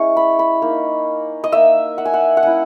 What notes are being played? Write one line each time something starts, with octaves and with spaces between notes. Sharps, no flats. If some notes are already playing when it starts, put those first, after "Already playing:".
Already playing: G#3 C#4 E4 C#6
B5
B5
A#3 D#4
D#5
A#3 D#4 E5
F#5
G#5
F#5
F#5
A#3 C#4 E4 G#5